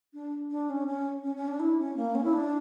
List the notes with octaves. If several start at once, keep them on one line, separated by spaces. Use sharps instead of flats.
D4
D4
C#4
C#4
C#4
C#4
D4
E4
C#4
A#3
C#4
E4
D4